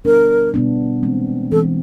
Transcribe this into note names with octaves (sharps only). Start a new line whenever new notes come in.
B2 G3 B3 D4 A#4
B2 G3 B3 D4
E3 G#3 C4
E3 G#3 C4 A4